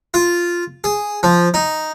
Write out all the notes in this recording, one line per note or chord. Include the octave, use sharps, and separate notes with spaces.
F4
G#4
F3
D#4